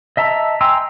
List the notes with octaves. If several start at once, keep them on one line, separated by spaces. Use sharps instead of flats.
D#5 E5 A5 A#5
G5 G#5 A#5 C6 E6